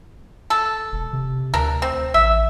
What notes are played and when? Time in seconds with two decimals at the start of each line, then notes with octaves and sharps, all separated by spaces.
0.50 A4
0.92 E1
1.13 C3
1.54 D2 D4 A#4
1.82 C4
2.14 A1 E5